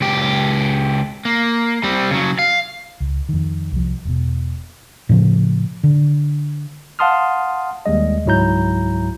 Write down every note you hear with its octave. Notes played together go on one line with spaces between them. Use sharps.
C#2 G4
A#3
G3 C4
C#3 F#3
F5
C#2
F2 D#3
C2 F3
E1 B2
A2 C#3 F3
D3
F5 F#5 A5 C6 D#6 F6
D#2 G3 G#3 D#5
C#2 G#2 F#3 E4 A#5 G6